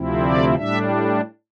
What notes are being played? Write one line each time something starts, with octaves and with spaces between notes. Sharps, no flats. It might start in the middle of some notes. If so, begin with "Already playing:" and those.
Already playing: D2 C3 F3 C4 E4
D5
A2 G3 D4 E5